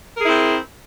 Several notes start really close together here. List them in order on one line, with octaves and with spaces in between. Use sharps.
A#4 G#4 E4 C4